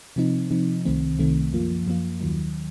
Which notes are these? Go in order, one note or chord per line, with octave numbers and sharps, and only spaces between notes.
C3 F3 C4 D#4
C3 F3 C4 D#4
C2 C3 D#3 A3 C4
C2 C3 D#3 A3 C4
F#2 F3 A#3 F4
F#2 F3 A#3 F4
D#2 D#3 F#3